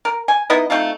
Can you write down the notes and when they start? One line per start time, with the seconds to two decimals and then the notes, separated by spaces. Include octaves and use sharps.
0.05 A#4
0.28 G#5
0.50 B3 D#4 E4 D#5
0.70 A3 C4 D#4 F4